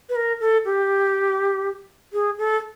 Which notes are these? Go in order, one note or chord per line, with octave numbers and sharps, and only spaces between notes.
B4
A#4
A4
G4
G#4
A4